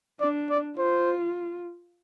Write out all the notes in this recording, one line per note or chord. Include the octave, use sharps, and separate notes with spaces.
D4 D5
D5
F4 C5